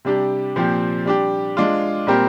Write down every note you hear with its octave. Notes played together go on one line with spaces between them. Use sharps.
C3 G3 D4 G4
A#2 F3 C4 G4
G3 D4 G4
G#3 D4 F4
A#2 G3 C4 G4 A#4